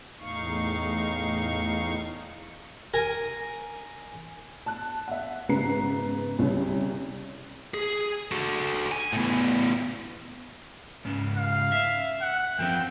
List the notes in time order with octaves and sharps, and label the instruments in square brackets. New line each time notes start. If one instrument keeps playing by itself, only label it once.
[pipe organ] E2 A2 D#4 F5 C#6
[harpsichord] A#4 G#5
[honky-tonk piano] A5 F#6
E5 F#5
G#1 C#3 B3 B4 A#5 C7
C2 C#3 C#5
[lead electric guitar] G#4
F#4 A4
G#5
A2 B3
[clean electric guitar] C#2 G#2 C#3
[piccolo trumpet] F5
[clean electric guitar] E5
[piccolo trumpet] F#5
[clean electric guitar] F#2 F3 C4 [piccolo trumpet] G5